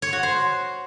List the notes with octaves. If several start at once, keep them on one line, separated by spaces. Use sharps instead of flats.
C#5
F#4
C5